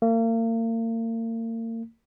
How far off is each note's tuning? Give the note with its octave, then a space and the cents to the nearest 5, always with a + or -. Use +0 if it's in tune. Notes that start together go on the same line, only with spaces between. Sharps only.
A#3 -40